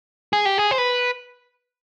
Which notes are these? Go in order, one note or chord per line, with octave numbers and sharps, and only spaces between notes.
G#4
G4
G#4
C5
B4